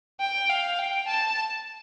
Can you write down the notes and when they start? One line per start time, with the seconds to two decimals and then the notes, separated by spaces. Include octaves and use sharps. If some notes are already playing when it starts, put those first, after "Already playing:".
0.20 G5
0.50 F5
0.79 G5
1.08 A5